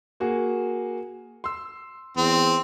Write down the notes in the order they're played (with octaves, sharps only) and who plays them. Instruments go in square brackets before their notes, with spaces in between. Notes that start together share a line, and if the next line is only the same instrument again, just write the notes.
[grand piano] A#3 F#4 G#4
C6 E6
[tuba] E2 [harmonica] C4